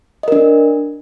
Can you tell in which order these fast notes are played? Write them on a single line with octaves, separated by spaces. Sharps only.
D#5 A#4 D4